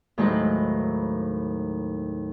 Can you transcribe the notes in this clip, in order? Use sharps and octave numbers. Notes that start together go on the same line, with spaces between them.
D#2 A2 F#3 G#3 B4 C5